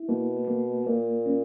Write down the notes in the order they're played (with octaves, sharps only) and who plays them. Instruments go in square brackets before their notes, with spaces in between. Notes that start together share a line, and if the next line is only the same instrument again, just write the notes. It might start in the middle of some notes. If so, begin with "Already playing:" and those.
Already playing: [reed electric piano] E4
[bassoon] B2 [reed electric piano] A#3
[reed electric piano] A#3
[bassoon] A#2 [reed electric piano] A#3
[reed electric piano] C#4